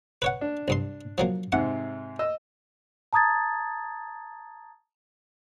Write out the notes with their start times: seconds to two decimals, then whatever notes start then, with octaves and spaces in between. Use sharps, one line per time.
0.22 B4 C#5 F#5
0.41 D4
0.68 C2 G2 C6
1.18 F3 F#3 A#3
1.52 G#2 C3 F#5
2.19 D#5 E6
3.13 A5 A#5 D#6 G#6 A6